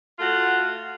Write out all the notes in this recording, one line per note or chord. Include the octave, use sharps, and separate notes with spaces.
A3 F4 F#4